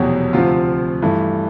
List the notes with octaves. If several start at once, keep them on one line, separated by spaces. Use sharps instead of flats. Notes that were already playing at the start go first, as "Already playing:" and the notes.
Already playing: F1 E2 B2 F#3 G4
D2 C3 F3 F4
G2 E3 A3